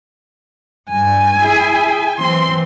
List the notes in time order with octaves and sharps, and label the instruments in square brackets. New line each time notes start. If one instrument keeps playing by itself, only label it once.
[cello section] G2 [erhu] G#5
[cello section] E4 G#4
[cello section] E3 F#3 C4 [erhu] C6